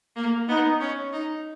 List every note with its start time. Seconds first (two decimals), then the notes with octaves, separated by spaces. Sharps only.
0.16 A#3
0.48 B3 D#4
0.80 C#4
1.13 D#4